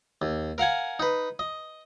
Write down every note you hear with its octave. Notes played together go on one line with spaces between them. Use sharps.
D#2
A#4 F5 F#5 G#5
D#4 B4
D#5